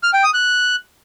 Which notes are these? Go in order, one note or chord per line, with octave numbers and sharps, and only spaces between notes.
F6
G5
D#6
F#6